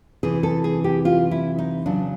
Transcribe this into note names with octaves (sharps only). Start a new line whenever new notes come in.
C3 E3 G#4
A4
G#4
G4
F4
E4
D#4
C#3 F#3 D4